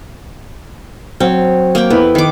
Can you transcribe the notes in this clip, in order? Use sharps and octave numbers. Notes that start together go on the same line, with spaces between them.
F#3 C4
A#3 G5
F2 B3 E4 B4
D#3 D6